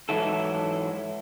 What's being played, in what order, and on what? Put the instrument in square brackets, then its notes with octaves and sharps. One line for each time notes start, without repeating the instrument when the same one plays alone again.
[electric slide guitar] G#2 E3 F#3 E4 A4